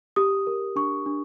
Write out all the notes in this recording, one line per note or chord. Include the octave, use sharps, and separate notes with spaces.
G4 D#6
A#4
D4 C#6
D4